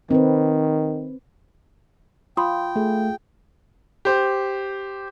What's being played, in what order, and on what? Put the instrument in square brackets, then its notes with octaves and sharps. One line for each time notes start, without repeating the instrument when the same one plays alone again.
[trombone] D#3 [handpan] C4 B4
[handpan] F4 [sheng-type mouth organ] G5 [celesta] B5 C6 D#6
[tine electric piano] A3 [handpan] G#4
[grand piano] G4 C5